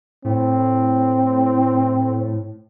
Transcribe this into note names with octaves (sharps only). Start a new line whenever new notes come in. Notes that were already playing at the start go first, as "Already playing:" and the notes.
A2 C4